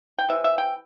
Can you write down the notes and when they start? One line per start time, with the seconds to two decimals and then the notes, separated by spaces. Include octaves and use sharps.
0.18 G5
0.28 C3 E3 E5
0.44 E5
0.58 G5